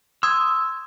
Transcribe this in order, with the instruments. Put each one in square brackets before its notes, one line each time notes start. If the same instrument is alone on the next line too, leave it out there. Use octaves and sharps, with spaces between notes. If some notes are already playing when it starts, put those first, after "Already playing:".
[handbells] C6 D#6 G#6 [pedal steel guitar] E6